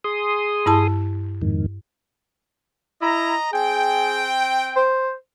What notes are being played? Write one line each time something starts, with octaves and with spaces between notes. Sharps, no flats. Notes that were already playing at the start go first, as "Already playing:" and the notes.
G#4 C6 D#6
G2 E4 A5
F2 G#2 D#3
E4 D#5 A#5
C4 G#4 G5
C5